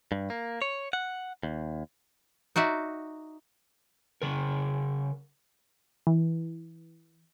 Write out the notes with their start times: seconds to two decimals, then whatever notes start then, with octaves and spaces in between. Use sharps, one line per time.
0.12 G2
0.30 A#3
0.62 C#5
0.93 F#5
1.43 D#2
2.56 D#4 F#4 D5 E5
4.22 C#3 A#4
6.07 E3